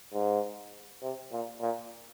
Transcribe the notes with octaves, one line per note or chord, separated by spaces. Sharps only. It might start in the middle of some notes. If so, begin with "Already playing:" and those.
G#2
C3
A#2
A#2